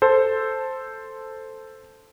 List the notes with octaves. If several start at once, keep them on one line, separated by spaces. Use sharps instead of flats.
A4 C5